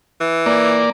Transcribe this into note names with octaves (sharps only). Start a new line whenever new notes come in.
E3
A#3 D5